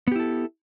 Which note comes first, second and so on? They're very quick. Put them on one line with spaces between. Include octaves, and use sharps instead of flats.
B3 G4 E4 A4